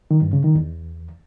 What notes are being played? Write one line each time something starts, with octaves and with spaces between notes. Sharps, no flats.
D#3
G2
C#3
D#3
E2